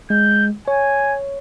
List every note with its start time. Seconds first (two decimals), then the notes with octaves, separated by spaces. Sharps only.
0.10 G#3 G6
0.68 C#5 G#5